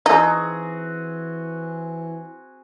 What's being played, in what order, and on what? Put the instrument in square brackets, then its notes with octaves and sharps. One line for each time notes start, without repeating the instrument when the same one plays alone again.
[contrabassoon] E3 [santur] C4 F#4 G#4 [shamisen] D#4